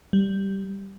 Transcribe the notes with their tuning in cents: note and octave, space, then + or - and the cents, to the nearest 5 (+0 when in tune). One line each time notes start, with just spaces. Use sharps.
G3 -5